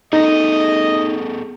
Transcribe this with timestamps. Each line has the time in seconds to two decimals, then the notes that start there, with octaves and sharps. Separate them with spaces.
0.13 B3 D#4 G#4 A4 D#5